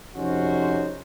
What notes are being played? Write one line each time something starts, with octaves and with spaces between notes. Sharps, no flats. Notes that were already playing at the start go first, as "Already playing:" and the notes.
F2 C3 C#4 D#4 F#4 C5